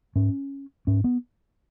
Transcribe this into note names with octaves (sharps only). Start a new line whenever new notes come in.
G#2 C#4
G#2 C#4
B3